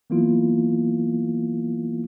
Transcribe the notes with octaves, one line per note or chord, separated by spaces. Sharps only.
E3 F#3 A#3 B3 E4 F4